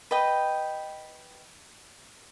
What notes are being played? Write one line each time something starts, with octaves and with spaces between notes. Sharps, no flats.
B4 D#5 G5